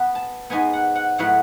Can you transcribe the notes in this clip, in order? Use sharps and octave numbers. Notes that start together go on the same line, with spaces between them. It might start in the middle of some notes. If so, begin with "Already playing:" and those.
Already playing: B3
A5
G#2 G#3 B3 G#5
F#5
F#5
A2 F#3 B3 F#5